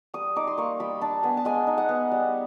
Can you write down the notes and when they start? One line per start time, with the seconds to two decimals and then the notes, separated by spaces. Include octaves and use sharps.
0.14 G3 D#6
0.36 D#4 D6
0.47 C6
0.58 A#3 C#6
0.80 G3 B5
1.01 D4 A5
1.23 B3 G#5
1.37 A5
1.45 G#3 G#5
1.67 D#4
1.78 F#5
1.89 B3
2.12 G3